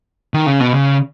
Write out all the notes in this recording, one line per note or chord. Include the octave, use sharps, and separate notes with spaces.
D#3
C#3
B2
C#3